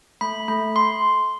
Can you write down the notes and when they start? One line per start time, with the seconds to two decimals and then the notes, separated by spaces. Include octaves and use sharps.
0.21 A3 B5
0.48 A3 B5
0.76 C6